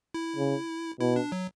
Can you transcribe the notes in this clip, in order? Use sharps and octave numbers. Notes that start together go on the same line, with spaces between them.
E4
C#3
B2 E4
D4
F#3